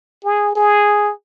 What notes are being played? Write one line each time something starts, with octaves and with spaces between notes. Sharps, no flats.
G#4
G#4